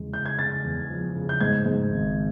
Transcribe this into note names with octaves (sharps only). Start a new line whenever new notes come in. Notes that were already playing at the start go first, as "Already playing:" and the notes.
Already playing: E2 C#3 G#3
C#3 G6
G#6
C#3 A6
E2
F3
C#3
G6
G#2 G#6
G#2
G#1